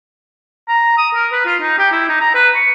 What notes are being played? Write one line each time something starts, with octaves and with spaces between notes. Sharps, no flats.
A#5
D#6
A#4
B4
F4
D#4
G4
E4
D#4
A#5
B4
C#6